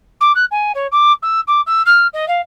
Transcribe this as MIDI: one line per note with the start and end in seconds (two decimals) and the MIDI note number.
0.21 0.32 86
0.35 0.45 90
0.51 0.72 80
0.75 0.87 73
0.92 1.12 86
1.22 1.40 88
1.48 1.61 86
1.66 1.82 88
1.86 2.07 89
2.13 2.28 75
2.28 2.41 77